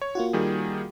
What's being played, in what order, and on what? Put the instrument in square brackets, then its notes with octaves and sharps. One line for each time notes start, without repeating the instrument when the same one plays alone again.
[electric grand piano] C#5
[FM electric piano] A#3 F4 F#4
[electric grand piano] D#3 G3 G#4